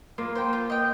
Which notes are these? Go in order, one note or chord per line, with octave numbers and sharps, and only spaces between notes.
A#3 F4
C5 G5
F4
D#5 G5